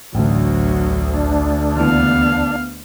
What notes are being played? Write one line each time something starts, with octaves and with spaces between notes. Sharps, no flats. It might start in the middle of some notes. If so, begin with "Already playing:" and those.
A1 D2 F#3
D4
D#2 E3 B3 F5